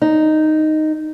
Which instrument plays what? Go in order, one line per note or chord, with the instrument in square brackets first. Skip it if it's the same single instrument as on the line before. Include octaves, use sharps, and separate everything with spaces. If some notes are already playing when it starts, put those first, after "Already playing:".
[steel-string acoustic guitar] D#4